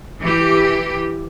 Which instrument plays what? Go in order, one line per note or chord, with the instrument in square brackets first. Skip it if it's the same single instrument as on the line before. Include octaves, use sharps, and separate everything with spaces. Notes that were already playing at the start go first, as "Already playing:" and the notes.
[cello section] E3 G4